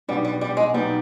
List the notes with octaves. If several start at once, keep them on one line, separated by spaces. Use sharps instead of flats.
B1 B2 G3 B3 D4
G3
G3
G#3
B1 B2 G3 B3 D#4